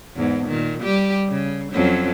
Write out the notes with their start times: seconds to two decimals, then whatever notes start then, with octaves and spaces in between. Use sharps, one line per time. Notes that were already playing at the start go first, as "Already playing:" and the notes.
0.16 E2 G#2
0.48 A#2 D#3
0.83 G3 G4
1.29 C#3
1.72 F2 F#3 C#4